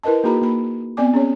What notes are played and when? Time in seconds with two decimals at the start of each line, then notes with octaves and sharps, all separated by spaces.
0.03 E4 A#4 B4 D#5 A5
0.24 A#3 D#4 F#4 G#4 A#5 B5
0.42 A#3 B5
0.97 B3 C4 D5 G#5 D6
1.14 C#4 G#4 C#5